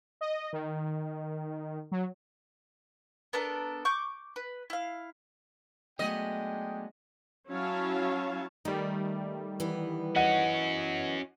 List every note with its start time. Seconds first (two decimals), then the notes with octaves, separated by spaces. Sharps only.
0.21 D#5
0.53 D#3
1.91 F#3
3.33 B3 D4 A4 A#4
3.85 C#6 D6 G6
4.36 B4
4.70 E4 F5
5.99 F#3 G#3 A3 B3 D4 D#5 G5
7.50 F#3 C#4 E4 C#5 F5 A5
8.65 D#3 G3 A3
9.60 E3 B3
10.16 C#4 F#4 D#5 F#5 D#7